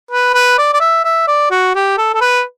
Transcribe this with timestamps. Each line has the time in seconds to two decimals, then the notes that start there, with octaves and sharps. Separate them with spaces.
0.11 B4
0.34 B4
0.58 D5
0.74 D5
0.80 E5
1.05 E5
1.27 D5
1.51 F#4
1.75 G4
1.97 A4
2.14 A4
2.21 B4